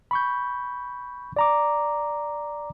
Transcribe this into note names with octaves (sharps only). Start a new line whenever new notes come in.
B5 C#6 G6
D5 A#5 D6